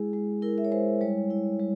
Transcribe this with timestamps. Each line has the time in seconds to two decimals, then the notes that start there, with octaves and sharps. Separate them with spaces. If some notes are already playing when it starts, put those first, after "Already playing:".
Already playing: G#3 E4 G#4
0.13 G#3
0.42 E4 A#4
0.58 E5
0.65 C#5
0.71 G#3 C5
1.01 G3 C#5
1.30 E4
1.59 G3